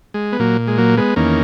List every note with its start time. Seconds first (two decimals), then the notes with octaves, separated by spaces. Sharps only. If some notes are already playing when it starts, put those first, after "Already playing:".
0.14 G#3
0.32 B3
0.39 A#2 F#3 A#3
0.67 G#3
0.78 F#3 A#3
0.97 G#3 B3
1.16 E2 D#3 A#3 C#4